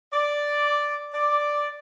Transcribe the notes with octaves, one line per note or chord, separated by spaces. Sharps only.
D5
D5